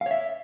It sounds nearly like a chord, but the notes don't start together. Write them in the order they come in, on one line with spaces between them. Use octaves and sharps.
F5 C#5 E5